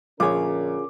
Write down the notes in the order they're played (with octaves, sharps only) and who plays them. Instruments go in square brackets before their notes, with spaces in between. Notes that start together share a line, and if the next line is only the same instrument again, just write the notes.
[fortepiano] A#1 C#5 [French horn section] D3 C#4 A#4 [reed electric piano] F4 G#4 [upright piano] D6